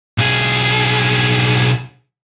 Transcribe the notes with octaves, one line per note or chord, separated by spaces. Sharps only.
B1 G#4